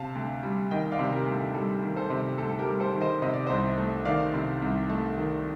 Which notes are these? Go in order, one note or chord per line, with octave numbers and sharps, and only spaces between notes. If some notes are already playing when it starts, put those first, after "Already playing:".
Already playing: C3 F5 A5
D2
G3
D#3 D#5 G5
D5 F5
C3
G4 A#4
D2
A4
G3 A4
D#3
A4 C5
C3
D2 A4
A4
G4 A#4
G3
A4 C5
D#3
C5 D#5
C3 D#5
D5
C2 C5 D#5
A3
D#3 D5 F5
C3
C2
A3
D#3